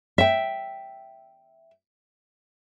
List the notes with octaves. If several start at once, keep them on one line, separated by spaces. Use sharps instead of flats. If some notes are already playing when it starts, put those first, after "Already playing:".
E5 G5